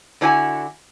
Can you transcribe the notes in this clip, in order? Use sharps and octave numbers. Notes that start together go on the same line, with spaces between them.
D3 D4 E4 F#4 G#5